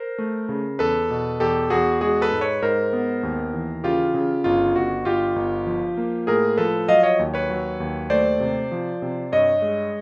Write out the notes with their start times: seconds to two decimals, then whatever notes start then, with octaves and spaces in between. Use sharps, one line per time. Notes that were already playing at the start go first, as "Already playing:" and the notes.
Already playing: A#4 C5
0.18 A3
0.49 C#3
0.79 E2 A4 B4
1.10 B2
1.40 E2 G4 A4
1.70 E2 F#4 G#4
2.01 G#3 F#4 G#4
2.21 A4 B4
2.32 G#2
2.41 B4 C#5
2.62 G#2 A#4 C5
2.93 B3
3.23 D#2
3.54 E3
3.84 C#3 F4 G4
4.14 C#3
4.44 G1 F4
4.76 G1 F#4
5.05 G1 F4 G4
5.36 G1
5.67 F3
5.97 A#3
6.27 A2 G#4 A#4
6.57 F3 A4 B4
6.88 F#3 D#5 F5
7.03 C#5 D#5
7.19 D#2
7.34 B4 C#5
7.50 F#3
7.80 D#2
8.10 A3 C5 D5
8.40 C3
8.72 F3
9.02 C3
9.32 G2 C#5 D#5
9.62 G#3